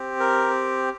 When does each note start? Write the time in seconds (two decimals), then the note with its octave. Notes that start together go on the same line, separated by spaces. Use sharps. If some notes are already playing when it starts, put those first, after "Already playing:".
Already playing: C4 G4
0.20 A#4